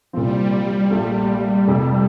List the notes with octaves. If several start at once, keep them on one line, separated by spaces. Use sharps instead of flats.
C2 A#2 F3 G3 C4
G3
A#1 A#2 G3 A3
F1 F2 C3